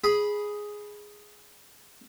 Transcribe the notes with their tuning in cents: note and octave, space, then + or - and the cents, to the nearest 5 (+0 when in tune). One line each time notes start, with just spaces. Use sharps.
G#4 +0 B5 -10